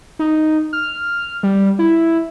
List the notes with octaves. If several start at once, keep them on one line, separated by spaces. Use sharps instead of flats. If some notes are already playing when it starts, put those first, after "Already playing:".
D#4
F6
G3
E4